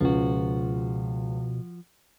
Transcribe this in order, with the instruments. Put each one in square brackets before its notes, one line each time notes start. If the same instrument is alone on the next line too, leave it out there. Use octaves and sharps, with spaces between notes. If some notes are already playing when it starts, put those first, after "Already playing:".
[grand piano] C#2 [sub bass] B2 [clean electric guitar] F3 F#4